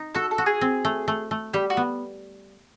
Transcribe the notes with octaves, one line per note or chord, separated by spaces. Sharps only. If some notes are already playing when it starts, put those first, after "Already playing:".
Already playing: D#4
F#4 A4
A4
F#4
G#4
C4
A3
A3
A3
G3 G4
F#4
B3